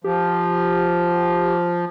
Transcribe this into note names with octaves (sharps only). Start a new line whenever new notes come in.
F3 G4